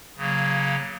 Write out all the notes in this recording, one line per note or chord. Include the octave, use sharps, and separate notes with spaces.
C#3 F#3 A#3